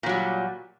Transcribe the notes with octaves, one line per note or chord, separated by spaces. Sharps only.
A#2 F#3 G3